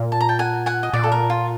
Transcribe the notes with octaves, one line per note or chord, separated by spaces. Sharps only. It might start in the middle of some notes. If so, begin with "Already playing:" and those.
Already playing: A#2
A5
A#5
G5 A5
F#5 G#5
F#5 G#5
D#5
A#2 D5
A4
A#4
F4